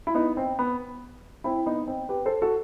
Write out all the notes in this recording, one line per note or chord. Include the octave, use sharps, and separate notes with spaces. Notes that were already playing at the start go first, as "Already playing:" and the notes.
E4
B3 D#4
C4
B3
C4 E4
B3 D#4
C4
G4 B4
A4 C5
F#4 A4